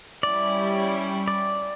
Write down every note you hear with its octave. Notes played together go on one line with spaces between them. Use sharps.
G3 C#4 E4 G4 D5
D5